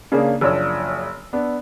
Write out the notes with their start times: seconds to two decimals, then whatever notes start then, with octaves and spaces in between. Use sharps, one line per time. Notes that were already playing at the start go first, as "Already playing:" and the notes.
0.12 C#3 A#3 C#4 D4 G#4
0.41 F#1 F3 D4 C#5 E6
1.33 B3 D4